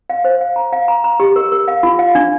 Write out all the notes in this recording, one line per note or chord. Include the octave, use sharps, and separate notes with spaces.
F5
C5
F5
A#5
F5
A#5
A#5
G4
A#4
A#4
F5
F4
F5
D4